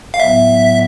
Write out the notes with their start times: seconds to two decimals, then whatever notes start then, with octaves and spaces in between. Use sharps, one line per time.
0.14 F5
0.20 A2 F#3 B3 E5